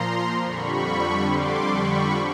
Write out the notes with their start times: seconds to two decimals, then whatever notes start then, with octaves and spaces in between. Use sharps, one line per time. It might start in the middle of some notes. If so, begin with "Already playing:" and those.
Already playing: A#2 F3 A#5 C6
0.42 F2 D3 G3 B5 C#6
1.29 C6 D6
1.73 B5 C#6